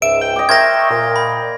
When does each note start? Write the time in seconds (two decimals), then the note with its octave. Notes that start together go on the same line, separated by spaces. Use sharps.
0.02 C#2 G#2 E5 D7
0.21 G5
0.36 G4 D#5
0.49 A#4 C5 E5 C#6 G#6 A#6
0.90 A#2
1.16 B5